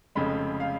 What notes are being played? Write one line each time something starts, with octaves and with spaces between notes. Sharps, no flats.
F1 F2 C#3 G#3 B5
F5